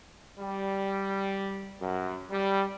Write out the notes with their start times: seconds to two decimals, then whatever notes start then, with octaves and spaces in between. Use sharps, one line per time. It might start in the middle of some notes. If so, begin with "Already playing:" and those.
0.40 G3
1.81 F#2
2.31 G3